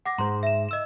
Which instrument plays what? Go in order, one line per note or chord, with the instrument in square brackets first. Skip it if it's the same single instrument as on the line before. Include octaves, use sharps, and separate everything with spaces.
[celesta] F#5 D6 A#6
[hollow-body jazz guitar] G#2 G#3 C5 [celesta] A#5 C6
[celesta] E5 E7
D#5 E6 E7